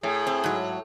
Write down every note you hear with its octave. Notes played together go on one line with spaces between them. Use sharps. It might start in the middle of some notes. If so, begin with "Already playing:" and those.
A2 G#4
C4
G#2 F#3